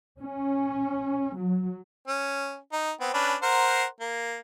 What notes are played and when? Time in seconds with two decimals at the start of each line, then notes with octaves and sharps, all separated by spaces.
0.20 C#4
1.37 F#3
2.08 C#4
2.73 D#4
3.00 B3 C4
3.14 C#4 D4 B4
3.42 A#4 C5 F#5
4.01 A#3